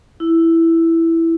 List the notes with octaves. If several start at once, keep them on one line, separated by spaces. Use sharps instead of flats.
E4